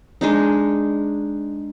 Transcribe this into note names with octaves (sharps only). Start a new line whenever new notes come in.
G#3 D4 D#4